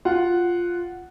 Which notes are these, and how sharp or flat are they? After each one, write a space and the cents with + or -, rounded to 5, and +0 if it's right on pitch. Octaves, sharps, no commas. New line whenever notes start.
F4 +0 F#5 +0